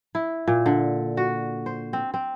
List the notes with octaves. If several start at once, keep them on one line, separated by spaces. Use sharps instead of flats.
E4
A#2
D3
F#4
C5
C4
C4